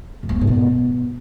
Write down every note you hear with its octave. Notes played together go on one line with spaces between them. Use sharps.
A2
G#3
B3
G#2
B2